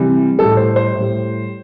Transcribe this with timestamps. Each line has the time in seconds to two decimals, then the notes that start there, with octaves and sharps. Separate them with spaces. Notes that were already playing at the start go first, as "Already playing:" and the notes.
Already playing: C3 E3 G3
0.39 A2 G3 A4
0.57 C5
0.76 C5
0.94 A2
1.00 G3